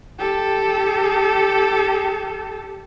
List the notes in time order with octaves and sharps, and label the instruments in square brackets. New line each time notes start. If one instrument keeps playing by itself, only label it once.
[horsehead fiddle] G4 A4